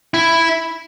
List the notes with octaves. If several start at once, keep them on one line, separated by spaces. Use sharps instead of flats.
E4